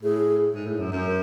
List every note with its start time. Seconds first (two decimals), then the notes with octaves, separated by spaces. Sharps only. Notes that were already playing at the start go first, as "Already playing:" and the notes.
0.03 A2 G#4
0.54 G#2
0.66 A2
0.80 F#2
0.92 F#2
1.06 A#4